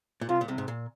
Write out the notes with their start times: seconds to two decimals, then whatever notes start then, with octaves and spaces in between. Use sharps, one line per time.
0.21 A#2
0.29 C2 C3 F4
0.41 A#2
0.48 C2 C3
0.58 G#2
0.68 A#2